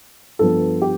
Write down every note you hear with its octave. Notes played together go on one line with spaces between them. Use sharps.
G2 F3 B3 A4
G4